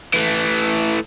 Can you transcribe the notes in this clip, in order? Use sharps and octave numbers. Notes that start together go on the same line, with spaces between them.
E3 A3